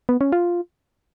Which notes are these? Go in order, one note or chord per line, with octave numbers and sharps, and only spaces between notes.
B3
C#4
F4